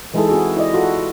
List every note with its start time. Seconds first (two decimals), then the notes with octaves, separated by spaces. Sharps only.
0.14 E3 G#3 D#4 E4 G#4 A4
0.29 C4 F#4 G#4
0.57 E4 D5 D#5
0.73 F4 F#4 A4